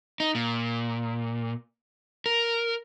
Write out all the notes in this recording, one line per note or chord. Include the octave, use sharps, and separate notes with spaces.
D#4
A#2
A#4